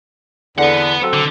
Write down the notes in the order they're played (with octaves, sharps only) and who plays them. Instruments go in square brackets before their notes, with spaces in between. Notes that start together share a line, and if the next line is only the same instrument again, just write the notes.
[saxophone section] E2 D3 [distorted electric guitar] B4 F#5
[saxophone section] F#3 C4 A4
[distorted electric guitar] D3